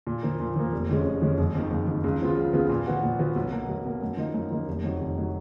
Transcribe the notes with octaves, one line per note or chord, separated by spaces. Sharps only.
A#2
F3 A#3
A#2
F3 A#3
F1
F2 F3 G#3 C#4
F1
F2 F3 G#3 C#4
F#1
F2 D#3
F#1
F2 D#3
C#2
C#3 F3 B3 F4
C#2
C#3 F3 B3 F4
A#2
F3 B3 F#4
A#2
F3 B3 F#4
B1
B2 A#3
B1
B2 A#3
F#2
F3 A#3 D#4
F#2
F3 A#3 D#4
F1
F2 D#3 F#3
F1
D#3 F#3